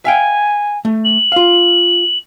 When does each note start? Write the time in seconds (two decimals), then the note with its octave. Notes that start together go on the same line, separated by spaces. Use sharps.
0.05 E5 F5 G5 G#5
0.85 A3
1.04 F#7
1.32 F4 F5